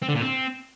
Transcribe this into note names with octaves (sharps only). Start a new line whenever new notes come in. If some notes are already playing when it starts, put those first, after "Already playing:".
C4
D3
A#2
C4